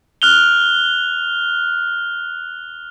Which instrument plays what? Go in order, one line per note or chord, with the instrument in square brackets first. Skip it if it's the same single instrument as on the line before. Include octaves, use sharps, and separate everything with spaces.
[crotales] F6 F#6 F7 G7